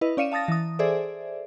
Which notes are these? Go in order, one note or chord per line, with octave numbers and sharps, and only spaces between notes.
E4 B4 D#5
C#4 D5 F5 C#7 D#7 E7
F5 A5 D#6 A6 A#6
E3 D#6
G#4 A4 C5 D5 E5